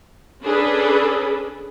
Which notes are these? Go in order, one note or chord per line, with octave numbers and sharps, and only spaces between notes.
C#4 D4 G#4 A4 B4